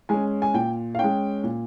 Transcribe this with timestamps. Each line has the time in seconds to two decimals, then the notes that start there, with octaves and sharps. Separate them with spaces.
0.09 G#3 C#4 G#5
0.42 G#5
0.54 A#2 G5
0.95 F5
0.99 G#3 C#4 G5
1.44 A#2